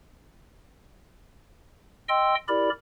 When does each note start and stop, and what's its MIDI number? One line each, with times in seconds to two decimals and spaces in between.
2.09 2.35 75
2.09 2.35 79
2.09 2.35 84
2.09 2.35 88
2.48 2.70 64
2.48 2.70 67
2.48 2.70 70
2.48 2.70 74
2.48 2.70 83